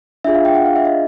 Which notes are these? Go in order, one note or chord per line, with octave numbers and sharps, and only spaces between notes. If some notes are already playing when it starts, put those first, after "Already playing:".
D4 F4 G#4 E5
F5
G5
F#5
F5
E5
D#5